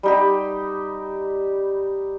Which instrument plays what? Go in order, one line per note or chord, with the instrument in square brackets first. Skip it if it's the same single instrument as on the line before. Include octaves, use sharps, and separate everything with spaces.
[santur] G3 D#4 G4